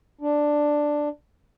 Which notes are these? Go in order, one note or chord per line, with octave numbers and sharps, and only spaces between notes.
D4